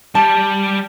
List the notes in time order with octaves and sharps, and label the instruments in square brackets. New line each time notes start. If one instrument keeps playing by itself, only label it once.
[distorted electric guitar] G3 G4 [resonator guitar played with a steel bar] A5